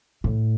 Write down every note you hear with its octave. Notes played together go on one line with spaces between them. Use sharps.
A2